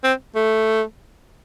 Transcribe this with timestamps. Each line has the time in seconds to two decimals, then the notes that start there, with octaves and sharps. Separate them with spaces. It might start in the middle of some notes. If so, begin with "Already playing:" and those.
0.04 C4
0.35 A3